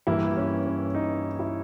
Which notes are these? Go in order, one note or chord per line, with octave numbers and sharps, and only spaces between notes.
G2 E3 A#3 E4
C#4
C#4
D#4
E4